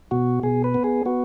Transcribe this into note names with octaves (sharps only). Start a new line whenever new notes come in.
B2 F#4
B2 G#4
B4
B3
G#4
B3 F#4